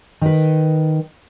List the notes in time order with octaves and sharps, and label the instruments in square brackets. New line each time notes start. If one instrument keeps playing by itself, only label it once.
[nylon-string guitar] D#3 B4